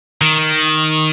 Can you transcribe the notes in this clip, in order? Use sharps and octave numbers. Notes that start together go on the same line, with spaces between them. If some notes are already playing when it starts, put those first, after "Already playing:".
D#3